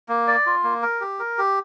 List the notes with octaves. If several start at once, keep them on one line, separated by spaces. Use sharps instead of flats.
A#3
D5
F4
A#3
A#4
G4
A#4
G4